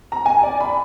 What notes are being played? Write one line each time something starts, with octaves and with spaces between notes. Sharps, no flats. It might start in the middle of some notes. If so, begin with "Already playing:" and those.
A#5
G#5
D5
B5